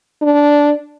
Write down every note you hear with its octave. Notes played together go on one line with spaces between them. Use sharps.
D4